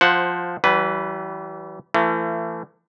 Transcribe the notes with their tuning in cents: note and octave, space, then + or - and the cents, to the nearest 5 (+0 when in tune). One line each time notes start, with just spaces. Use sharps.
F3 +10 C5 +0 F#5 +5
E3 +0 G3 -45 B4 +0
E3 +40 A3 +35